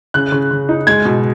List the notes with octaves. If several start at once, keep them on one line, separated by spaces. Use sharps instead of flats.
C#3 F#6
C#3
C#3
D#4
G#3 G#6
B2